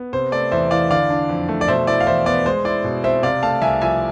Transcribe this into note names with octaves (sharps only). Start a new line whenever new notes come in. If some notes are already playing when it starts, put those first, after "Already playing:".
Already playing: B3
C3 C5
A3 D5
E2 C5 E5
E3 D5 F5
D3 D5 F5
D4
F2
A3
D5
B2 C5 E5
E4 D5
F5
E2 C5 E5
B3 D5
G#3 C5
E4 D5
B2
C4 C5 E5
C3 D5 F5
A3 F5 A5
C2 E5 G#5
F3 E5 G#5